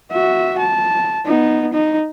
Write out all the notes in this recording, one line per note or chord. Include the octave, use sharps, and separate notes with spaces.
F#4 E5
A5
B3 D#4
D#4